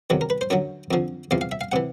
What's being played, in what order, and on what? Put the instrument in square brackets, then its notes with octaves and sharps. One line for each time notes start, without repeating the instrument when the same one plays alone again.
[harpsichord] E2 C3 D#3 F#3
A#4
B4
C5
F#2 D3 F#3 C#5
F2 D3 F3
E2 C3 F3 F5
F5
E5
F5
C3 E3 F#5